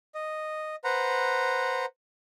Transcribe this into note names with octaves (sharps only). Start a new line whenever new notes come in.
D#5
B4 C5 F#5 A#5